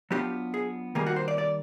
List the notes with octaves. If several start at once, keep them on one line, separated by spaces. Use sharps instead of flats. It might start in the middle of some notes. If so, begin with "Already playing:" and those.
F#3 B3 D4 F4 G4
G#4
D#3 G3 A#3 G#4
F#4
C5
D5
D5